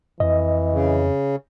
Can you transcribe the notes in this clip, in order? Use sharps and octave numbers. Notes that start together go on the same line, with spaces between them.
F2 E3 D#5
C#3